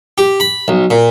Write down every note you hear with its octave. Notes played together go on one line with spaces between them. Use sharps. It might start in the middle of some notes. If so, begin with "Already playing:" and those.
G4
B5
B1
A#2